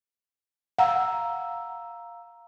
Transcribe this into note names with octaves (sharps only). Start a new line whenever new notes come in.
F5 F#5 A#5 E6